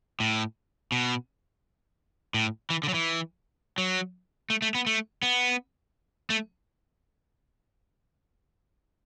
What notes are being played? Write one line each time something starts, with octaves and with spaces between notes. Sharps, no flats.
A2
B2
A2
E3
D3
F#3
E3
F#3
A3
A3
B3
A3
B3
A3